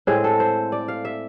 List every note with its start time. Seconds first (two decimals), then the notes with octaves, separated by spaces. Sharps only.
0.07 A2 G#3 C4 G#4
0.24 A4
0.40 C5
0.72 D5
0.88 F5
1.05 E5